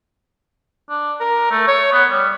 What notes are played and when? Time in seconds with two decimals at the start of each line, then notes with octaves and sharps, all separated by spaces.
0.90 D4
1.20 A#4
1.51 A3
1.68 C#5
1.93 B3
2.11 G3